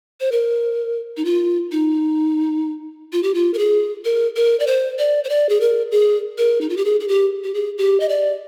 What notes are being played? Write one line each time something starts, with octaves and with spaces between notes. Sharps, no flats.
C5
A#4
D#4
F4
D#4
F4
G4
F4
A#4
G#4
A#4
A#4
D5
C5
D5
C5
D5
G#4
A#4
G#4
A#4
D#4
F4
G4
G#4
G#4
G4
G4
G#4
G4
D#5
D5